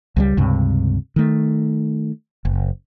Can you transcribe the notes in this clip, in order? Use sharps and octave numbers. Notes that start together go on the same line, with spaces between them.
C#2 F#3 G3
C#2 G2 C3
D#3 A3
F#1